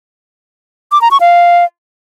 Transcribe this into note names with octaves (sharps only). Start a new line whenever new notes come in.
D6
A#5
C#6
F5